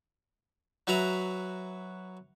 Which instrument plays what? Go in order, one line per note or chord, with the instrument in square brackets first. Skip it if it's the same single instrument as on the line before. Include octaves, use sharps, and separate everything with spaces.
[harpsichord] F#3 F#4 B4 E5 A#5